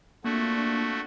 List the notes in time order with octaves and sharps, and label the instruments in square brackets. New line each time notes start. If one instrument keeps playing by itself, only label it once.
[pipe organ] A3 F#4 [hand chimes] A#3 [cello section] C4 D4 F4